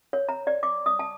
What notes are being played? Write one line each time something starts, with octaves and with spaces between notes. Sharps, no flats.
C#5
A#5
D5
D6
D#6
A5